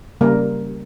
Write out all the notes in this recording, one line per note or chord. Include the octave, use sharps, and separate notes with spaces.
C#3 G3 A#3 A#4